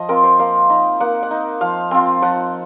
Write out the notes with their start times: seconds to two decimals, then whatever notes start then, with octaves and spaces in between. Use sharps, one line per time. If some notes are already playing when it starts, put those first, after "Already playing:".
Already playing: F3 D#5
0.09 C4 F4 A#4
0.24 C5
0.39 A#3 F5
0.70 D#4
1.00 A#3 F#5
1.23 F#5
1.31 D#4
1.61 F3 F5
1.91 C4 F4
2.22 F3 F#5